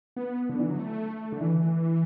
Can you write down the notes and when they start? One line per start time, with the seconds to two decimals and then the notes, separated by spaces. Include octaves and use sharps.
0.16 B3
0.50 D3
0.60 E3
0.70 F#3
0.79 A3
1.32 D3
1.41 E3